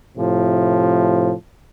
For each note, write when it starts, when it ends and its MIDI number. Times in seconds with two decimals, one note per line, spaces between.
0.18 1.33 45
0.18 1.33 48
0.18 1.33 53